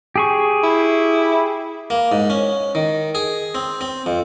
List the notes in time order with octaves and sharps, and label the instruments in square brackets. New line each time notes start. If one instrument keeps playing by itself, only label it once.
[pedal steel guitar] G4 G#4 C#6
[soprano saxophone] E4
[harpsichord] A#3
G#2
C#4
D#3
G#4
C4
C4
F2